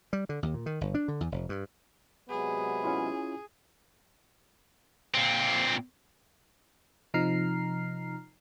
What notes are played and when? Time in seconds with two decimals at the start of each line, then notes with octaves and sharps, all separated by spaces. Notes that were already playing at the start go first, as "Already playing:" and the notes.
0.13 G3
0.29 D3
0.43 D#2
0.54 A#2
0.66 D#3
0.81 G1
0.95 D4
1.08 D3
1.21 E2
1.32 F1
1.49 G2
2.29 C3 F#3 G#3 B3 G#4
2.84 C#4 E4 F4
5.14 A#2 C4
7.14 C3 F3 D#4 A#5 F6 C7